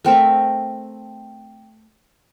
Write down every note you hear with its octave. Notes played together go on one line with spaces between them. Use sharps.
A3 C4 A#4 E5